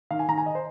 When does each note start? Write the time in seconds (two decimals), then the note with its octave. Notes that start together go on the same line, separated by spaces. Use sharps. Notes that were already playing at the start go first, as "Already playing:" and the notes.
0.11 D#3 F5
0.19 G#5
0.28 D#3 A#5
0.38 G#5
0.46 D#5
0.55 C5